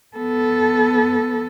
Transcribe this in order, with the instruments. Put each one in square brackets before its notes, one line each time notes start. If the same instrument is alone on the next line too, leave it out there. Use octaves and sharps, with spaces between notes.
[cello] B3 A4